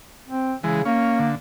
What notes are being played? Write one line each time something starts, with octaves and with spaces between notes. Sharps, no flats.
C4
C#3 E3 G#3
A#3 C#4
D3